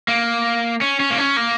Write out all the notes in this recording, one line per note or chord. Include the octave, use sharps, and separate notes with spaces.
A#3
C#4
C#4
A#3
C#4
A#3